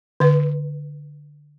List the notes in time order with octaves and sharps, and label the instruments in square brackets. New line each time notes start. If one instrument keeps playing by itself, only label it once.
[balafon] D3 B4